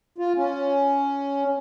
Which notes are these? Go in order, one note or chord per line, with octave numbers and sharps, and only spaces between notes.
F4
C#4